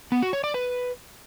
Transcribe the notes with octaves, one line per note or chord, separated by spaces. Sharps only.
B3
F#4
C#5
D5
B4